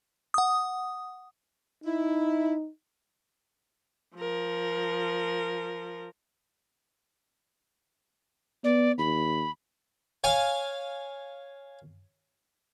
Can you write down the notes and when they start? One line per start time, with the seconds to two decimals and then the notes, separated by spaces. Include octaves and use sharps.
0.34 F#5 D#6
1.84 D#4 E4
4.16 F3 A#4
8.64 B3 D5
8.98 D#2 B5
10.24 C#5 F5 G#5